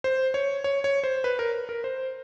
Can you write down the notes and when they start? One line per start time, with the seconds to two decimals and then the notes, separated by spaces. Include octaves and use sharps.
0.04 C5
0.34 C#5
0.64 C#5
0.84 C#5
1.04 C5
1.24 B4
1.39 A#4
1.69 A#4
1.84 C5